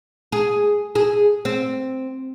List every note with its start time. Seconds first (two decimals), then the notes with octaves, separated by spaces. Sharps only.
0.32 G#4
0.95 G#4
1.45 C4